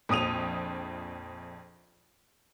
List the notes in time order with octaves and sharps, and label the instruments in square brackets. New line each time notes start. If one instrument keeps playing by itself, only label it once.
[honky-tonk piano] A#1 F2 D#6 D#7 F7